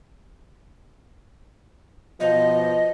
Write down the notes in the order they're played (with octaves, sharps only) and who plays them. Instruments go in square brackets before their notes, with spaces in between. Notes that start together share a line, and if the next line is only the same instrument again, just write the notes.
[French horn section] B2 F3 [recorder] D#5